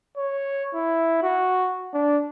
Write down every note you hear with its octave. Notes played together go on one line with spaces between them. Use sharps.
C#5
E4
F#4
D4